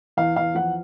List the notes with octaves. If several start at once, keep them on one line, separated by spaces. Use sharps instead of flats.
E2 F5
E2 F5
F3 F#5